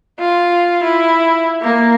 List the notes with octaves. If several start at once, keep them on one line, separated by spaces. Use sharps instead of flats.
F4
E4
A#3